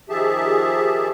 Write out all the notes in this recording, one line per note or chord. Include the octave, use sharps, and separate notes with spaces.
D#3 F3 G4 G#4 E5 A5